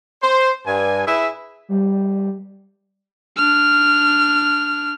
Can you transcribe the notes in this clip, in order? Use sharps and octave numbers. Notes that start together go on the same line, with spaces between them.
C5
G2 G#5
E4 G#4 B4 E5
G3
D4 F6